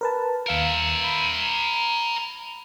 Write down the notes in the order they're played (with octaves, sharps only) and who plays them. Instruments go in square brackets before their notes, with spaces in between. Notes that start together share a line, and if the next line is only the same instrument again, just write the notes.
[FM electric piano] A#4 B4 A5
[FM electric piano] D#2 F5 C#7 [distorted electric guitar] A#4 E5
[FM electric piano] B5